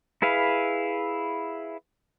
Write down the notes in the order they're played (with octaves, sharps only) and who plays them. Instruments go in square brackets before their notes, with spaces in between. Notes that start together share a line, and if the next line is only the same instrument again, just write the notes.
[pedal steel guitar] E4 G#4 B4 F5